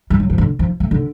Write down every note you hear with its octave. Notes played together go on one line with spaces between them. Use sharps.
G#3
F#3
F3
D3
F3
A3
D3